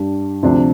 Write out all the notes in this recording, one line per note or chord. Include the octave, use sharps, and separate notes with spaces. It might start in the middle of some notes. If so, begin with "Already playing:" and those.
Already playing: G2 G3 D4
D2 C3 F3 D4